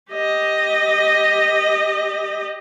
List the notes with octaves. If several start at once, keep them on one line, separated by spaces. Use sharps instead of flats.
G4 D#5